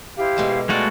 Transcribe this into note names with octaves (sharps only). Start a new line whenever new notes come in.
E4 G4 C5 F5
B2 G#3 A3
G#3 A3 B3 F4 F#4 A4 D5 G5